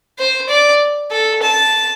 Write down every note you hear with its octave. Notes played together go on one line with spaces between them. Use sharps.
C5
D5
A4
A5